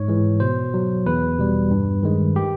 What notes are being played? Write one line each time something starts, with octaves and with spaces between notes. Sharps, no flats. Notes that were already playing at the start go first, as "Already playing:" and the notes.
Already playing: G#2 C#5
E3 G#3
B2 C5
F#3
E2 B4
B2 G3
G2
D#3 G#3
G4